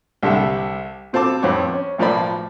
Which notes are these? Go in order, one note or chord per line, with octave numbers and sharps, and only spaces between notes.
C2 D3 G4 A4 E5 F#5
B2 C4 F4 A4 A5 D6
F2 D#3 B3 C4 C#5 D6
C#4
B1 A2 F3 A#4 D5 B5